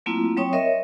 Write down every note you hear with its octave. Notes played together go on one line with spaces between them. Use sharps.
F#3 A3 A#3 C4 E4 F4
F#3 C4 C#5 G5 C#6 D#6
A#4 C#5 D#5 E5